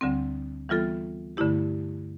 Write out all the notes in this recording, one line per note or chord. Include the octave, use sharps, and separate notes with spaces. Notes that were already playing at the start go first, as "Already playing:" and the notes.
D2 D3 G3 C4
E3 G3 B3 F4 A4
G2 D3 A3 E4 G4